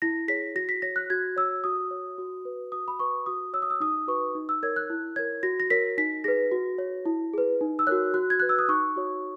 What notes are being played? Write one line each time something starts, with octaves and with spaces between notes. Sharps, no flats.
E4 A#6
G#4 C#5 B6
F#4 A#6
B6
C#5 A#6
F#6
F#4 G#6
C#5 E6
F#4 D#6
C#5
F#4
B4
F#4 D#6
B5
B4 C#6
F#4 D#6
C#5 E6
D#6
E6
D#4 D#6
F#4 B4 C#6
D#4
E6
A#4 C#5 G#6
F#6
E4
A#4 C#5 G#6
F#4 A#6
A#6
A#4 C#5 B6
D#4 B6
G#4 B4 A#6
F#4
C#5
E4
G#4 B4
D#4
E6
F#4 A#4 C#5 F#6
F#4 F#6
G#6
B4 F#6
E6
D#6
D#4 C#6
F#4 C#5